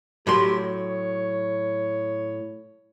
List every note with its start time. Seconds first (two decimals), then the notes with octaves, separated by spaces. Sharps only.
0.27 A2 F#3 G4 C6
0.57 C#5